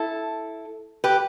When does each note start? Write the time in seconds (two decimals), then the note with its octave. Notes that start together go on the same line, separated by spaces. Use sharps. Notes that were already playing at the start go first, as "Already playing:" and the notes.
Already playing: E4 A4
1.04 G4 B4